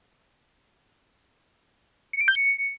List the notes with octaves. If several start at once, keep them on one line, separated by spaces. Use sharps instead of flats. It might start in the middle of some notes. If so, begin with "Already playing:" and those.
C#7
D7
G6
C#7